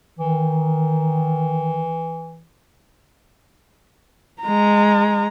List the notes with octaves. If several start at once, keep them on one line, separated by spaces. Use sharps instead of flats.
D#3 E3
G#3 A#5